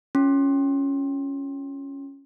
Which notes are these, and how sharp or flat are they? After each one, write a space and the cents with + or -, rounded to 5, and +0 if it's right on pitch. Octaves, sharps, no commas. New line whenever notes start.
C#4 +0 F4 +0 C6 +25